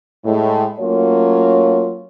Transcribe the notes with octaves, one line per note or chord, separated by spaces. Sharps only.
A2 G#3
F#3 A3 A#3 C#4 F4 C#5